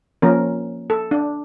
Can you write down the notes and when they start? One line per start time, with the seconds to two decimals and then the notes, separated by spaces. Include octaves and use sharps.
0.22 F3 A#3 C#4 A#4
0.90 A4
1.11 D4